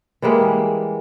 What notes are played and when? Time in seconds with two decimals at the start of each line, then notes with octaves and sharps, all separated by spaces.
0.22 E3 G3 G#3 A#3